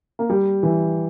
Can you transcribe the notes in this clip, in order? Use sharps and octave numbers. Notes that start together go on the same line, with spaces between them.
A#3
G3
E3